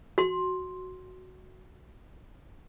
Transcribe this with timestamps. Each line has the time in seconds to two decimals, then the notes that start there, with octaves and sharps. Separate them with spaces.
0.18 F#4 C6